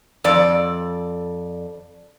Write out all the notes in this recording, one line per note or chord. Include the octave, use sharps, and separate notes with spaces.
F2 D5